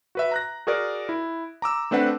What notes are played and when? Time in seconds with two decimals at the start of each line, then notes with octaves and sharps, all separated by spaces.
0.15 F#4 B4 E5
0.31 A#5 F#6 A#6
0.67 F#4 G#4 A#4 D5
1.09 E4
1.62 A#5 D6 E6
1.91 A3 C4 D4 B4 F#5